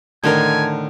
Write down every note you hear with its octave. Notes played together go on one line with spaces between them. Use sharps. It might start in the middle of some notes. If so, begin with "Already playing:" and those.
A2 D3 D#3 A#4 G#5 C6